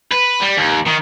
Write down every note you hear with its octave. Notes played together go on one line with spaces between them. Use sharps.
B4
G3
D#2
D#3